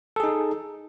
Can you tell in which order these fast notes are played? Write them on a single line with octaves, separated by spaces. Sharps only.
A4 G#4 D#4